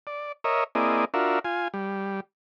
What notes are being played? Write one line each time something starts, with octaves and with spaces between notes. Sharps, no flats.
D5
A#4 C#5 D#5 E5
A#3 C4 E4 G#4 D5 D#5
D4 F4 F#4 A#4 E5
F4 G#5
G3